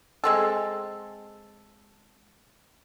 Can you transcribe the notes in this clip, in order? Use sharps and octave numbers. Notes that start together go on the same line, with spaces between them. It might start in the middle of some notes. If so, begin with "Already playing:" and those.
G#3 C4 A4